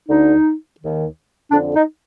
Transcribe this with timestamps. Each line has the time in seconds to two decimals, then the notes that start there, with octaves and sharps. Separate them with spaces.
0.09 D2 D3 D#4
0.80 D#2 D#3
1.51 F2 D3 D4
1.75 D#4